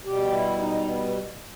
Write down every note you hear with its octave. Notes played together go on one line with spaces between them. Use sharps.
B2 G3 G4
E4
D#4
B3